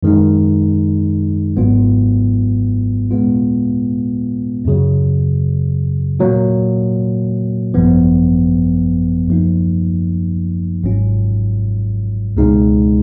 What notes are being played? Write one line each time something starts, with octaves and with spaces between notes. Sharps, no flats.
F#2 D#3 G#3 D#4
G#1 G#2 F#3 B3 F4
A#2 G#3 B3 F4
F#2 C#3 F#3
A#2 F#3 A#3
G#1 F#2 F3 B3
F#2 F3 A#3 D#4
G#1 G#2 F#3 C#4 F4
C#2 B2 G#3 D#4